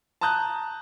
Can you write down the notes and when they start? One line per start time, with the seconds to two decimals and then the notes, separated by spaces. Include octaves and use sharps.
0.21 A5 A#5 D#6 F#6 G6